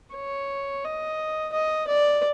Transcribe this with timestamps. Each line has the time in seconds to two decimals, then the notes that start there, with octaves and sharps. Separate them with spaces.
0.15 C#5
0.85 D#5
1.53 D#5
1.88 D5